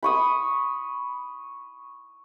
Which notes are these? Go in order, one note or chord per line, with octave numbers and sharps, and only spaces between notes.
B5 C#6 D#6